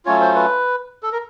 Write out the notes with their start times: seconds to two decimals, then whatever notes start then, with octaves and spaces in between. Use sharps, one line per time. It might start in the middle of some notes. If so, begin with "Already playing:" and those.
0.05 F#3 A3 C#4 F4 C#5
0.21 C5
0.35 B4
1.03 A4
1.12 A#4